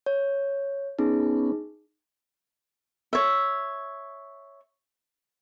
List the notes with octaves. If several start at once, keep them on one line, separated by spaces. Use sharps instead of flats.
C#5
B3 C#4 D#4 G#4
C#5 E5